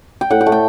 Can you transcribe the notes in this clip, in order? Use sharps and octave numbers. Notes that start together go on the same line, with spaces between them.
G5
A2 F#5
G5
A3
G5